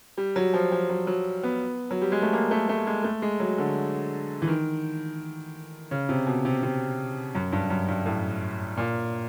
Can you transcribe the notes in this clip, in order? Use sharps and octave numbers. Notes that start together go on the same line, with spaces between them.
G3
F#3
F3
F3
F#3
F#3
B3
F#3
G3
G#3
A3
A#3
A3
A3
G#3
A3
G#3
F#3
D3
E3
D#3
C#3
C3
B2
C3
C3
F#2
G2
F#2
G2
A2
A#2